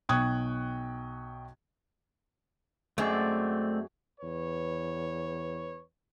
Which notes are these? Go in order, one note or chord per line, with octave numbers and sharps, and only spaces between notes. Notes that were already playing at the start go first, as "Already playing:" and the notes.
B1 G5 C#6 D#6 F#6 G#6
F#2 G#3 A3 C4 D5
E2 B4 C#5